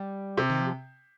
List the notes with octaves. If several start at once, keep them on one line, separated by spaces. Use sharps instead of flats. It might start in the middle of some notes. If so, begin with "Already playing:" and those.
Already playing: G3
C3
D#3
F3